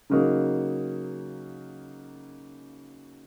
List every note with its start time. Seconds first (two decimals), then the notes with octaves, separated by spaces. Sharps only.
0.10 C#3 F#3 A#3 D#4